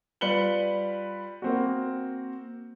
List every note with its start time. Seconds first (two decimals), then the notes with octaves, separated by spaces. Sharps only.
0.21 G3 F4 B4 C#7 F#7 G7
1.42 A#3 C4 F#4